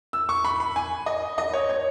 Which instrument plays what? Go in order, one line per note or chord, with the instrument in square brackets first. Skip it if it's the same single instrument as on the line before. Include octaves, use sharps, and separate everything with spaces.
[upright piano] E6
C#6
B5
B5
G#5
D#5
D#5
C#5
C#5